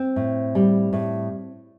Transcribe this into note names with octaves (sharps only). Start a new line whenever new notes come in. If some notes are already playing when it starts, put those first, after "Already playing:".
Already playing: C4
A2
G3
A2